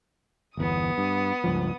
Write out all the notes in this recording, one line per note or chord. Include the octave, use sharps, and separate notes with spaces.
G1 E2 B3 D#6
G2
C#2 G2 F3